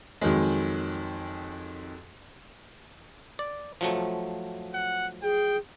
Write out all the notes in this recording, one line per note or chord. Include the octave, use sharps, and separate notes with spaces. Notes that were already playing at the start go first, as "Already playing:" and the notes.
F2 D#3 F#3 G#3
D5
F3 F#3 A3
F#5
G#4 G5